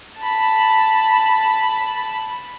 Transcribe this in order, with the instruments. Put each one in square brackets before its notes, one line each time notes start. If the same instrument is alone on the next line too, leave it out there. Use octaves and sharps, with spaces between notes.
[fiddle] A5 B5